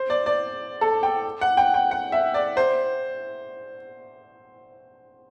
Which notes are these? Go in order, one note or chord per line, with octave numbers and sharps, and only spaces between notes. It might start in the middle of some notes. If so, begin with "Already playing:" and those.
Already playing: C5
D5
D5
A4
G5
F#5
G5
G5
F#5
E5
D5
C5